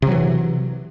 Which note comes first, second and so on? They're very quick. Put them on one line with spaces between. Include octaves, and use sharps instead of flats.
C3 F#3 E3